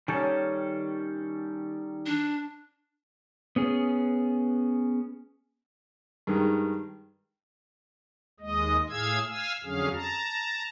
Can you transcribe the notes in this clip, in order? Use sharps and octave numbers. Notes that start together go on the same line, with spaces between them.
D#3 G3 C#4 A4
D4
B3 C#4 G#4
G2 D#3 G#3
D#2 G#3 D#5
A2 G#4 F5 E6 G#6
F5 G#5 E6
F2 D3 F#3 C#4 G#4 F5
A5 A#5